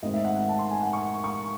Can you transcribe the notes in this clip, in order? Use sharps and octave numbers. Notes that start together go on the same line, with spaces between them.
G#1 G#2 D#3 A3 C4 D#5
E5
F#5
F#5
A5
C6
G#5
F#5
C#6
C#6